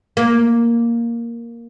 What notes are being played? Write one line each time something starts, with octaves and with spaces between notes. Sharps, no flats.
A#3